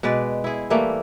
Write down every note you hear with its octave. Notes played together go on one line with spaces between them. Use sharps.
B2 G#3 B4 D5
E4 G#4
E3 G3 A3 A#3